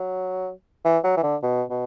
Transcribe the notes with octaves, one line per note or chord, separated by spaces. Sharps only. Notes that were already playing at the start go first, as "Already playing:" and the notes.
Already playing: F#3
E3
F#3
E3
D3
B2
B2